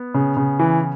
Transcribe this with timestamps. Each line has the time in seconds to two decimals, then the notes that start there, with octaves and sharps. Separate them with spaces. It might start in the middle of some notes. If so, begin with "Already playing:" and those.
Already playing: B3
0.14 C#3
0.37 C#3
0.59 E3